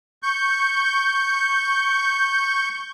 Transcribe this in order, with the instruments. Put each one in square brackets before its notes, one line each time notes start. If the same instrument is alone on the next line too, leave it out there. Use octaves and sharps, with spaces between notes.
[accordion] C#6 G6